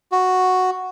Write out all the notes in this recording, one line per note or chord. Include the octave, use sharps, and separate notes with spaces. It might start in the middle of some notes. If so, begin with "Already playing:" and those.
F#4